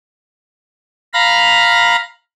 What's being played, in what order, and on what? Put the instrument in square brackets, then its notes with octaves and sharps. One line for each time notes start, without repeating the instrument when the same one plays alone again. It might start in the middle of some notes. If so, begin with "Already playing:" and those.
[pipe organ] F5 A#5 B5 A#6